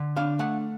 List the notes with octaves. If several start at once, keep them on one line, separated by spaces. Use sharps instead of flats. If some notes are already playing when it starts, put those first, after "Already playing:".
Already playing: D3
D4 F5
A3 F#5